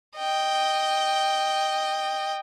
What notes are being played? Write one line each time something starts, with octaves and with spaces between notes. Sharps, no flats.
D#5 G5